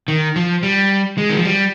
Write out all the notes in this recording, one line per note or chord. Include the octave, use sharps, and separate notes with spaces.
D#3
F3
G3
G#3
D#3
F3
G3